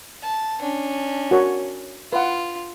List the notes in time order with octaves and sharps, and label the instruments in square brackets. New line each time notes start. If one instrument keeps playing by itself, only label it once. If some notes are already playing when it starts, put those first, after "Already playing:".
[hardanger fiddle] A5
C#4 D4
[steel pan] F#4 A#4 C#5
[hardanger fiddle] F4 [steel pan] B4 F#5